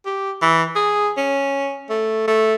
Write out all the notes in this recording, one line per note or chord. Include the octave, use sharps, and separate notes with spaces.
G4
E3
G#4
C#4
A3
A3